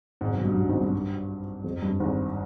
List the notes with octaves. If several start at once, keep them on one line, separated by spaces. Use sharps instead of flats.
G#1 G#2
B1 B2
G2
G2
G#1 G#2
G2
F2
G2
G#1 G#2